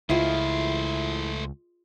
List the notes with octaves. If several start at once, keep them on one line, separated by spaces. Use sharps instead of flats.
C#2 A3 E4 F4 G#4 C5 D#5